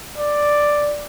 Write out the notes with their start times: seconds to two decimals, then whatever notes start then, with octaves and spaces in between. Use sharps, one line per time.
0.17 D5